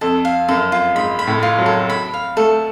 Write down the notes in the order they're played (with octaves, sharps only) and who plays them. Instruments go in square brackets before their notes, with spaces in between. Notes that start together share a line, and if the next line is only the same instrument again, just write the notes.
[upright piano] F2 [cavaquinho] A4
[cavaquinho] F5
[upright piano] F#2 [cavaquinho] A4
[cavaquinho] F4
[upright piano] G#2 [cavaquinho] B5
[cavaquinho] B5
[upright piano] A2
[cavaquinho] F4
[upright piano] F#3
[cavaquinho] A4
B5
F5
[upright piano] A3 [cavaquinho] A4